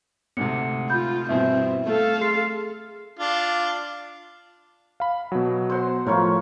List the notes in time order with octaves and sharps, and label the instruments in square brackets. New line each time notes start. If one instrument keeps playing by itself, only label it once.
[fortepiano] D2 G#2 C3 [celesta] F#5 C#7
[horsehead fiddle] F4 [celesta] B5 G6
[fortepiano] G2 B2 E3 [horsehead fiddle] C4 [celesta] E5
[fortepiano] A3 [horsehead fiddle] A4 F5
[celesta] G#4 C6 C7
[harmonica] D4 F4
[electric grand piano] F5 B5
B2 F#3
[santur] C5 F#5 C6
[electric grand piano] A2 F3 [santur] F4 A#4 C#5